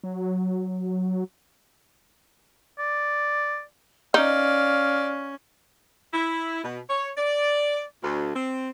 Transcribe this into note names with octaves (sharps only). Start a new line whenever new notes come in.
F#3
D5
C#4 D#4 D5 F5
E4
B2
C#5
D5
D2
C4